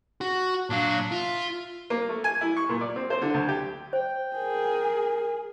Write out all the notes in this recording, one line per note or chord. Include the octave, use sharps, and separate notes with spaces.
F#4
A#2 F#3 D4 F5
F4 E5
A#3
A3
G#5
E4
C#6
A#2
D5
C4
C5
D3
D2
G4
C5 G5
G#4 A#4